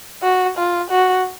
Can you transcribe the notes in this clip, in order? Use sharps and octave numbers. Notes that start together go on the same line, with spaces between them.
F#4
F4
F#4